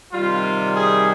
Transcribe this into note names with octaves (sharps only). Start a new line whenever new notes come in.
C3 D#3 G3 F4
G#4